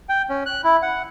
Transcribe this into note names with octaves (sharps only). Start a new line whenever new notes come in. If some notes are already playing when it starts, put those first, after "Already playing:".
G5
C#4
F#6
E4
F#5